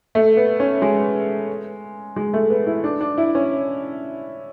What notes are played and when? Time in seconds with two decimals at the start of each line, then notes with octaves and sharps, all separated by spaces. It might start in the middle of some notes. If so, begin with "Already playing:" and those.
0.15 A3
0.37 B3
0.60 C#4
0.82 G#3
2.16 G#3
2.34 A3
2.50 B3
2.66 E4
2.84 D4
3.01 D4
3.18 E4
3.35 C#4